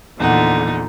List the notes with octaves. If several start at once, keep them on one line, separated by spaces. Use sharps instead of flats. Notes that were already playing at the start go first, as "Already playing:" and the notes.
E2 A#2 D3 F3 D#4 F#5